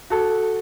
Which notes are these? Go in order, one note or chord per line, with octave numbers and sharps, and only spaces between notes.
F#4 A4